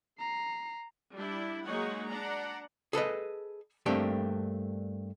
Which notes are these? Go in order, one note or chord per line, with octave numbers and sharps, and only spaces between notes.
A#5 C7
G3 D4 E4
F#3 G#3 A#3 D#4 C#5 F#5
D4 F#5 A#5
G#4 A4 B4 D#5
G2 A3 A#3 C4 D4 G4